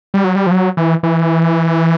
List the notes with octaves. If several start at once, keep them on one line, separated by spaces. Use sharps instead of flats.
G3
F#3
G3
F3
F#3
E3
E3